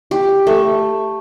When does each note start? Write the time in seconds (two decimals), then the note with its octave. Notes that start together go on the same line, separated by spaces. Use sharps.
0.11 G4
0.47 A3